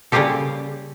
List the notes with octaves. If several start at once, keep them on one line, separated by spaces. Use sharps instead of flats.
C#3 G3 A#3 F4 G4 A4